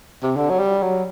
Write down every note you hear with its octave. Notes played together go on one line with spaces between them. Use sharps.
C3
D3
F#3
G3
F#3